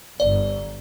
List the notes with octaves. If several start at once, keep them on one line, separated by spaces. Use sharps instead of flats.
G1 D5